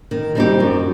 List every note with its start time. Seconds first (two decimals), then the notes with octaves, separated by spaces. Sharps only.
0.11 D#3
0.35 G3 C4 D#4 G4
0.60 F#2